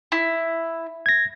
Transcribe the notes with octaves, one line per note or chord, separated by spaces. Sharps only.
E4
G#6 A#6